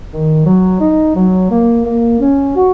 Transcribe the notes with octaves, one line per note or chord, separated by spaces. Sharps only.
D#3
F#3
D#4
F#3
A#3
A#3
C#4
F#4